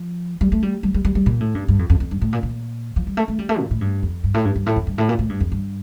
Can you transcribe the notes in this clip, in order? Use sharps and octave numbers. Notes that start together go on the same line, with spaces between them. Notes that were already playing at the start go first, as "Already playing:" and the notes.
Already playing: F3
G3
A3
G3
G3
G3
G3
G3
A#2
A2
G2
G2
F2
F2
F2
G2
A2
A#2
A#2
F3
G3
A3
A3
G3
A3
A#2
A2
G2
F2
G2
A2
G2
G2
A2
F2
G2
A2
A#2
A2
G2
F2
G2